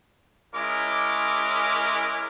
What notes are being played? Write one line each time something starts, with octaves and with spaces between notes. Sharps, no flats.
G#3 C#4 E4 A#4 D6